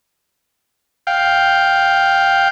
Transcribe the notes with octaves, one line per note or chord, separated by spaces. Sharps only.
F5 G5